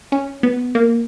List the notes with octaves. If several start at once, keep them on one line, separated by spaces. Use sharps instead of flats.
C#4
B3
A#3